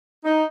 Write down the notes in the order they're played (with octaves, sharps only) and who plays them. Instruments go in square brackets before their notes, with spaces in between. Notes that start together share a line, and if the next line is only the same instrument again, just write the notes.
[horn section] D#4